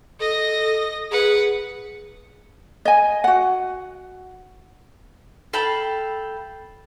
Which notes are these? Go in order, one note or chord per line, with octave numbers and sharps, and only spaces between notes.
A4 D#5 A#6
G#4 B4 F#5
D#5 G#5
F#4 F#5
A4 F5 G5 B5